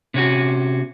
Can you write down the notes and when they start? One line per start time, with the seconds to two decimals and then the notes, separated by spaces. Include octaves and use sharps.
0.14 C3 C#4 F#4